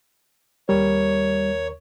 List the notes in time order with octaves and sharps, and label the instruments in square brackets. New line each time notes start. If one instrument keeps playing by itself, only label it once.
[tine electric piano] D#2 A#4 [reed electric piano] G3 [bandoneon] C#5